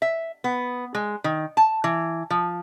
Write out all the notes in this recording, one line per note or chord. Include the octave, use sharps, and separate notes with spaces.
E5
B3
G#3
D#3
A5
E3
F3